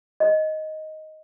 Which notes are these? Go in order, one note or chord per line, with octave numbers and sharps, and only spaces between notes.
D#5